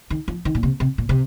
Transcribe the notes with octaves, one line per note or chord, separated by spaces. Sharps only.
D#3
F3
D#3
A#2
C3
C3
A#2
C3